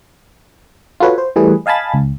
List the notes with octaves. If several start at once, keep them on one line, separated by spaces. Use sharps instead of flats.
F4 F#4 A4 B4 C#5
C5
E3 G3 A3 G#4 B4
D#5 F5 G#5 A5 B5 A6
C#2